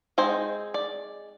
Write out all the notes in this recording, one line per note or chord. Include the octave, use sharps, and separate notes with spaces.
G#3 C4 D#4 C5
D5